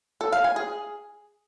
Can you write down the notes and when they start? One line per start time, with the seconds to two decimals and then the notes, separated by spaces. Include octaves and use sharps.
0.21 A4
0.32 F5
0.44 G#5
0.56 G#4